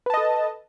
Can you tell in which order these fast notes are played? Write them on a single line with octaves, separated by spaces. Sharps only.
B4 A5 D#5 A4